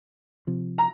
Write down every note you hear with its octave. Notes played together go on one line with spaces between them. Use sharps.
C3 F3
A#5